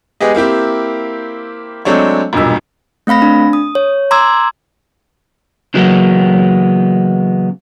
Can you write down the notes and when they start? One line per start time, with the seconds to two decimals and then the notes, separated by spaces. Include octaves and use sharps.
0.21 G#3 B3 G4 G#4 D#5
0.35 A#3 C4 E4 G4
1.85 F#3 G#3 A3 C4 D4 C#5
2.33 E1 B1 G2 A#2 E6
3.07 A3 C4 F5 B5 A#6
3.22 D4
3.53 D#6
3.75 C#5
4.11 A#5 C6 D6 E6 G#6
5.74 C#3 E3 F#3 G#3 A#3 B3